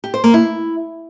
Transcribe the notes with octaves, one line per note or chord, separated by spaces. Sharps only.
G4
C5
A#3
E4